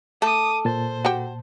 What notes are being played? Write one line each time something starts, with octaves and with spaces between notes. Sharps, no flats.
A3 A4 D6 D#6
A#2 C5 A5
F#4 G4